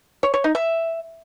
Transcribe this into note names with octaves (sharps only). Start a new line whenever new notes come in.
C#5
C#5
D#4
E5